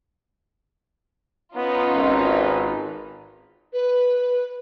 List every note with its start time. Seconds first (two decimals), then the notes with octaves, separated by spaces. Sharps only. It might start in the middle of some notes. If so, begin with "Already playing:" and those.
1.56 B3 C#4 D#4 F4
1.94 G#1 B4
3.73 B4